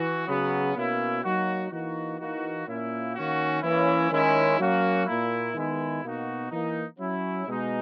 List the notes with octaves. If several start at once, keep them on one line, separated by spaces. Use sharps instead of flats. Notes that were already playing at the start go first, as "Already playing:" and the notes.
Already playing: E3 F#4
C#3 F#3 B3
B2 A#3 C#4 E4
F#3 A#3 D#4 F#4
E3 A#3 D#4 F#4
E3 A#3 D#4 F#4
A#2 A#3 C#4 E4
D#3 A#3 C#4 F#4
E3 A#3 C#4 E4
D#3 G#3 C#4 E4
F#3 A#3 C#4 F#4
A#2 A#3 E4
D#3 G#3 B3 E4
B2 A#3 D#4 F#4
E3 A#3 D#4
F#3 C#4 E4
B2 G#3 D#4